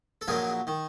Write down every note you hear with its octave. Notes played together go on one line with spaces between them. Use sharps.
A4
A#1 A#2 F#3 G#4 A#4
D#3